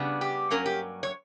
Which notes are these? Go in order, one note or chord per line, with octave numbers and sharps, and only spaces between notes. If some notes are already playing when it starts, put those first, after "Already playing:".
Already playing: C#3 G3 B3 D4
G4
G2 F#3 A#3 C#4 A#4
G4
C#5